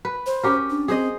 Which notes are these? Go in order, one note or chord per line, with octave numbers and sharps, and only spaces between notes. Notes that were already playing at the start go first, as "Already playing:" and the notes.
B4
C5
C#4 G4 A#4
D4
C4 G#4 C5 D#5